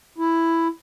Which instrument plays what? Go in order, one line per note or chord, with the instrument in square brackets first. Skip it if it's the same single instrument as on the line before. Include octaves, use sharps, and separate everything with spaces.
[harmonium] E4